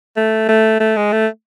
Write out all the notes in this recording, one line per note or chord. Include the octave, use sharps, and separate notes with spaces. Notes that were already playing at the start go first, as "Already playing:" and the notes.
A3
A3
A3
G#3
A3